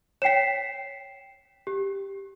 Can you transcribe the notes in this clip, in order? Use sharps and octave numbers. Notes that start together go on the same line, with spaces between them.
C#5 G5 B6 C7 E7
G4